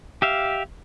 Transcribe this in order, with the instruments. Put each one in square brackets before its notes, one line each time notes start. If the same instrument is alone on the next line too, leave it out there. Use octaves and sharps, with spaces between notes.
[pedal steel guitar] G4 E5 F5